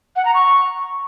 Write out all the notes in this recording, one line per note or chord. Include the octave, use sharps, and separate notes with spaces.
F#5
A#5
C#6